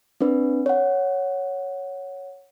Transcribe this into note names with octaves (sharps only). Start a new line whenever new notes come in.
C4 D4 B4
C#5 F#5